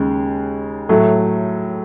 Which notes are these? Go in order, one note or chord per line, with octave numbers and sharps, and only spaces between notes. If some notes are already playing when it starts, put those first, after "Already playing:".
Already playing: D#2 C#3 G#3
A2 F#3 A3